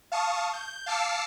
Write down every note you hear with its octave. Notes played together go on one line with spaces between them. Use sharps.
F5 A5 C#6 D#6
G6
F5 A5 D6 E6 C7 C#7